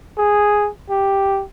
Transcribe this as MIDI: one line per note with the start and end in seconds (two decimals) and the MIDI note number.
0.18 0.70 68
0.90 1.43 67